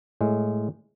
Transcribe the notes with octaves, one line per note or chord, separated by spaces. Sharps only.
A2 G#3